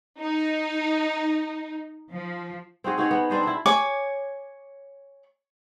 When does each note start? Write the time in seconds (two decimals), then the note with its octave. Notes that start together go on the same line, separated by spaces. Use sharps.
0.20 D#4
2.12 F3
2.84 C4 D#4 F#4 G#4
2.98 D#4 F#4 G#4 C#5
3.11 B3
3.30 C4 D4 C5 D#5
3.43 D4 E4
3.66 C#5 G#5 D6